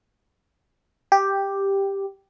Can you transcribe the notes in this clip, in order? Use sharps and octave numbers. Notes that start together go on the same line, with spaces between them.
G4